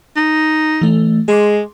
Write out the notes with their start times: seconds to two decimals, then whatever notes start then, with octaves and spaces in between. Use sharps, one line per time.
0.16 D#4
0.81 E3 A3
1.28 G#3 G#4 C6 D6